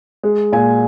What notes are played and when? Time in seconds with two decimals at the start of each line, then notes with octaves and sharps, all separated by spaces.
0.23 G#3
0.53 A#2 G#5